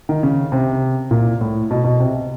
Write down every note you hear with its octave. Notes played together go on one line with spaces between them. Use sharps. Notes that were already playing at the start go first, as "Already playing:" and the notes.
D#3
C#3
C3
A#2
A2
B2
B2
C3